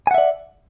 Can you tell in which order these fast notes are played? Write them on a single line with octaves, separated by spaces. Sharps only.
G#5 F#5 E5 D5